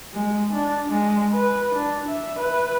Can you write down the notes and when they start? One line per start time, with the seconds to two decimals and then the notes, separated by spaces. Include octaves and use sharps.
0.13 G#3
0.52 D4
0.89 G#3
1.33 B4
1.74 D4
2.08 E5
2.39 B4